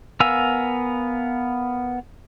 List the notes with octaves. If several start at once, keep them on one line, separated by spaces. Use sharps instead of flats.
B3 A#4 F5 G#5 E6